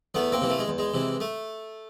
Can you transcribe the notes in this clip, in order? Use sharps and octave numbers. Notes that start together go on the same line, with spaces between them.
E2 A3 B3
A#3 C4
C3 E3
A3
G#3
E2
G#3
C3 E3
A3